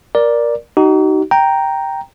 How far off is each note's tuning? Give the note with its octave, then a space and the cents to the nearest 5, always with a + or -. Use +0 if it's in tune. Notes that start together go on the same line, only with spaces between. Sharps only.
A#4 +15 D5 +0
D#4 +0 F#4 +45
G5 +0 A#5 +0